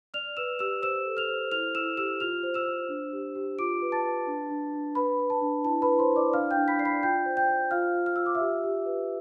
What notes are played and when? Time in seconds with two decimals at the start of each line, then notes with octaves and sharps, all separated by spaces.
0.14 D5 F6 F7
0.37 B4 E6 E7
0.59 G4 E6 E7
0.82 C5 E6 E7
1.06 A4
1.17 F6 F7
1.29 C5
1.51 E4 F6 F7
1.75 E4 E6 E7
1.97 G4 E6 E7
2.20 F4 F6 F7
2.43 C5
2.54 E6 E7
2.67 C5
2.89 D4
3.13 G4
3.35 G4
3.59 F4 D6 D7
3.82 B4
3.92 A5 A6
4.05 B4
4.27 D4
4.50 D4
4.73 D4
4.95 B4 B5
5.19 B4
5.30 A5
5.41 D4
5.64 E4 A5
5.82 B4 B5
5.88 E4
5.99 C5 C6
6.11 E4
6.16 D5 D6
6.34 D4 F5 F6
6.51 G5 G6
6.56 D4
6.68 B5 B6
6.79 D5 C7
6.85 B5 B6
7.02 F4 G5 G6
7.26 C5
7.37 G5 G6
7.49 C5
7.71 F4 F5 F6
7.95 F4
8.06 F6
8.16 F4 E6
8.26 D6
8.35 G4 E5 E6
8.64 G4
8.86 B4